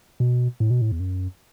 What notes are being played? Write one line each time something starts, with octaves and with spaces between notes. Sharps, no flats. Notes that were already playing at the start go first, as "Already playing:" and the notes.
B2
A2
B2
A2
E2
F#2